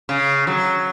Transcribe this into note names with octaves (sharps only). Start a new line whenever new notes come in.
C#3
F#3